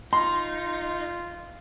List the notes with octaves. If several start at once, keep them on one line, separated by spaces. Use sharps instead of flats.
D#4 F4 C6